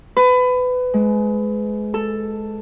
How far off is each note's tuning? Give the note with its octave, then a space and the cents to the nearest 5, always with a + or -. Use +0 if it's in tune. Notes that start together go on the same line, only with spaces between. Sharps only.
B4 +25
G#3 +25
A4 +5